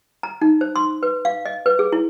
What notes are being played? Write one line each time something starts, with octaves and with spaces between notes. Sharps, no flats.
A#5
D#4
C5
C6
B4
F5
D#5
B4
G#4
E4